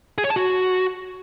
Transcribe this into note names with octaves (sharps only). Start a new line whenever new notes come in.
G#4
C#5
A5
F#4